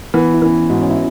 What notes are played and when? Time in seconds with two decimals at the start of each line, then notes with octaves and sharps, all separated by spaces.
0.14 E3 B3
0.34 E4
0.42 E3 C#4
0.70 G#2 F#4
0.82 C#4
0.90 E4